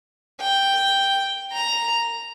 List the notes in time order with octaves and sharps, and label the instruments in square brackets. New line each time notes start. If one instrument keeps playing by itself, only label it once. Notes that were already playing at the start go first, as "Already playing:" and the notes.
[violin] G5
A#5